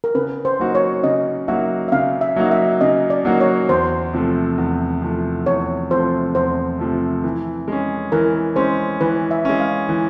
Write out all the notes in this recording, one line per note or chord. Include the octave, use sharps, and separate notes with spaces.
A#4
C#3 B4
C5
F#3 A#3 D#4 F#4
C#5
C#3 D#5
F#3 A#3 D#4 F#4 E5
E5
C#3 F5
E5
F#3 A#3 D#4 F#4
E5
C#3 D#5
D5
F#3 A#3 D#4 F#4
C#5
E2 C5
C3 F3 A3
E2
C3 F3 A3
E2 C#5
C3 F3 A3 C5
E2 C5
C3 F3 A3
E3
G#3 C#4
E3 A#4
G#3 C#4 C5
E3 B4
E5
G#3 C#4
F5
E3